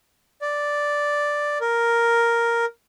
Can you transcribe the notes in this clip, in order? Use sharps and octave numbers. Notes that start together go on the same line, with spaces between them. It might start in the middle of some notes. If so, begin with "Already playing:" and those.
D5
A#4